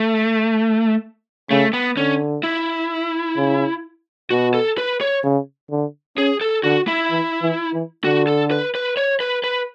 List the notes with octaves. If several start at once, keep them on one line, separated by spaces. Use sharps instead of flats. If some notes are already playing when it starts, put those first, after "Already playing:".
Already playing: A3
C#3 A3
B3
D3 C#4
E4
C#3
B2 F#4
A4
B4
C#5
C#3
D3
C#4 G#4
A4
D3 F#4
E4
E3
E3
E3
D3 F#4
A4
B4
B4
C#5
B4
B4